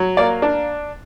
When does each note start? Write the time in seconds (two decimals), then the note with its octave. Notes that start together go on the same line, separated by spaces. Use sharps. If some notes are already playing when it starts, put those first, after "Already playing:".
Already playing: F#3
0.17 A#3 D5
0.42 D4